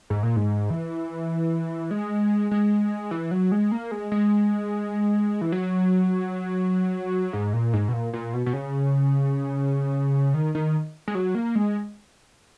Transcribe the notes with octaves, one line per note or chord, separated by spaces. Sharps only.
G#2
A#2
G#2
E3
G#3
G#3
E3
F#3
G#3
A#3
G#3
G#3
E3
F#3
G#2
A#2
G#2
B2
A#2
A#2
B2
B2
C#3
D#3
D#3
G#3
F#3
A#3
G#3